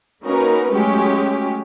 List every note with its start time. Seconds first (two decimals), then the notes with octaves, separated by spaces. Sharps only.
0.23 A#3 C#4 D#4 F#4 A#4 B4
0.72 F#3 G#3 A3 C#4 G4